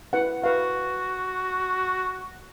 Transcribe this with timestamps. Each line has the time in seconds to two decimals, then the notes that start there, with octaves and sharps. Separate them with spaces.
0.13 E4 B4 F#5
0.44 F#4 B4 F5